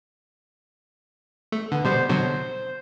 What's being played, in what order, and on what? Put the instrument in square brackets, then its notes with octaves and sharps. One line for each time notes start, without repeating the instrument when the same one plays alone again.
[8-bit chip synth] A3
[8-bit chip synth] D3 [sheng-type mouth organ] B3
[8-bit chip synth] B2 G3 [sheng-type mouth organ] C5
[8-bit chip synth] B2 D3 F#3 [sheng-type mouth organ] C5